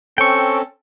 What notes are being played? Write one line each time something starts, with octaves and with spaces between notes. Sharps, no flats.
C4 C#4 A4 G5 C#6